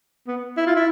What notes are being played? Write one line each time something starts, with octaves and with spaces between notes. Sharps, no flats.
B3
E4
F4
E4